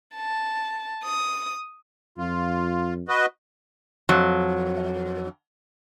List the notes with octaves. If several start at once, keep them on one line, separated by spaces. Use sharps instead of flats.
A5
D#6
F2 F4
F#4 B4 D#5
F2 F#3